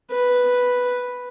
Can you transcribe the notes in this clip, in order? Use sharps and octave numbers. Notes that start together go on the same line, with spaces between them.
B4